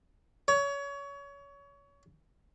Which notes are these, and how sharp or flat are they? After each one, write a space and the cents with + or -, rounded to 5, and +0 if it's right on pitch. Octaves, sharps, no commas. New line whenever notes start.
C#5 +25